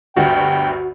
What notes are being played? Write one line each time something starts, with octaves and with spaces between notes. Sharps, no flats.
G1 D2 G2 F#4 G5